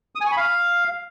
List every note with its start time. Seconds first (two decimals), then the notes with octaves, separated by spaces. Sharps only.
0.15 D#6
0.21 G#5
0.26 C#6
0.32 B5
0.37 F5